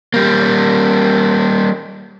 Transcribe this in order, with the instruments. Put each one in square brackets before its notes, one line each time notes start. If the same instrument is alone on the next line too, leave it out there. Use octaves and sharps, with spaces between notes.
[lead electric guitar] G3 A#3